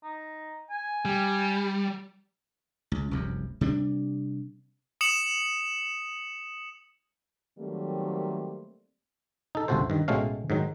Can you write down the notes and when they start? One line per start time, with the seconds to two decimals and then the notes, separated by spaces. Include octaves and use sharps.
0.03 D#4
0.70 G#5
1.05 G3
2.92 C#2
3.11 F1 C2 F#2
3.61 C3 G3 D4
5.01 D#6 C#7 E7 F#7
7.58 D#3 F#3 G3 A3 A#3 C4
9.55 D#4 A4
9.68 G1 C#2 C3 F#4 A4 C5
9.90 G2 D#3
10.08 A1 B2 G#3 A3 C#4 F5
10.50 G#2 D#3 F#3